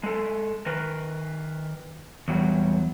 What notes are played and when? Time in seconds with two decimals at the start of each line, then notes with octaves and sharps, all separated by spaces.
0.03 G#3 A4
0.66 D#3 A#4 B4
2.28 E2 A#2 F#3 G3